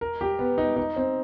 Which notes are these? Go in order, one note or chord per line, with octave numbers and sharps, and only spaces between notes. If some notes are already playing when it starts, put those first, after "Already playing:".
A#4
G4
B3
D#4
D#4
C4